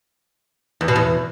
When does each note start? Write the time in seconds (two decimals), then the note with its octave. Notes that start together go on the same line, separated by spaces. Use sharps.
0.81 E2
0.88 B2
0.96 E2